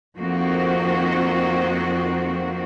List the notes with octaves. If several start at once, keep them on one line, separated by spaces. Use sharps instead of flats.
F2 D#3 A#3 C4 F#4